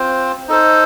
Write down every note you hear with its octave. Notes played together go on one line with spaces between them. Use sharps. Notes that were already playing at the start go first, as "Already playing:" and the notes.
Already playing: C4 F4 C5
D#4 A4 C5